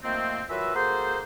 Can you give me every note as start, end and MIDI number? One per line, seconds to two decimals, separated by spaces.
0.04 0.43 51
0.04 0.43 53
0.04 0.43 57
0.04 0.43 58
0.04 0.43 60
0.50 0.72 52
0.50 0.72 54
0.50 0.72 65
0.50 0.72 70
0.50 0.72 71
0.50 0.72 76
0.75 1.22 58
0.75 1.22 66
0.75 1.22 68
0.75 1.22 69
0.75 1.22 72